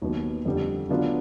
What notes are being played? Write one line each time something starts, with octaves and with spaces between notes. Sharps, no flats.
D#2 D#3 F#3 B3
F2 D3 G3
D3 F#3 B3 D4 F4